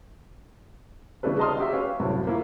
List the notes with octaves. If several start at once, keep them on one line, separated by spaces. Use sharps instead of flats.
C#3 G3 D4 E4 A4 B4
D#5 A5 A#5 C6 D#6 F6
F#4 G4 E5
C#4 G4 B4 F5
C2 F#2 A2
A#3 E4 F4